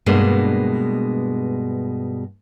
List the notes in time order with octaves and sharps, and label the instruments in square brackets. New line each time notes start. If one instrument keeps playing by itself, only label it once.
[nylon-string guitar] G2 B2 G#3 A#3 D4